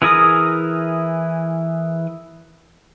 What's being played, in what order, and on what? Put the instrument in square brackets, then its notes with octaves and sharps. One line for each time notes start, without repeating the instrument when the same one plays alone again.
[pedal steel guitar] E3 E4 G#4 A#4 D#6